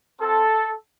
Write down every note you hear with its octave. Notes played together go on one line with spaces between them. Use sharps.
C4 F4 A4